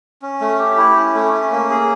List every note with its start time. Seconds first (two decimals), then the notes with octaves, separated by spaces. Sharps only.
0.22 C#4
0.41 A3
0.59 G4
0.77 E4
0.96 C#4
1.14 A3
1.33 C#4
1.51 A#3
1.70 G#4